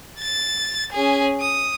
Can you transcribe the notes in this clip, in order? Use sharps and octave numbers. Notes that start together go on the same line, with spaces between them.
A6
C#4 G#4
D#6